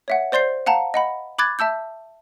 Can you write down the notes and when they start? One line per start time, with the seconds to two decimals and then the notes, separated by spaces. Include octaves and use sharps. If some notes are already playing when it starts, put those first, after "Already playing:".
0.08 C#5 E5 F#5
0.32 C5 D5 C6 G6 C7
0.66 F5 F#5 A5 A#5
0.94 D#5 F#5 B5
1.38 B5 D6 F#6 G#6 A6
1.59 E5 A5 E6 G6